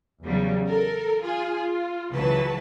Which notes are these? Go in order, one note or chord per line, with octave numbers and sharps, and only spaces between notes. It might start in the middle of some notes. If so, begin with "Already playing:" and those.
E2 C#3 F#3 G3
A4 A#4
F4 G#4
F4
C#2 E3 F#3 B4 A5